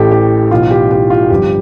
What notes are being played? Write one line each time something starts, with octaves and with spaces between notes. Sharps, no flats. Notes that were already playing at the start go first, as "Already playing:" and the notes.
Already playing: A1 A2 E3 G4 A4
G4
B1 A2 E3 F4
G4
G4
F4
G1 G2 F3 G4